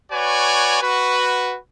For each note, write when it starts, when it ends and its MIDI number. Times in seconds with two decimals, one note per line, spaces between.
0.12 0.81 66
0.12 0.81 71
0.12 0.81 73
0.12 0.81 74
0.12 0.81 80
0.82 1.57 66
0.82 1.57 71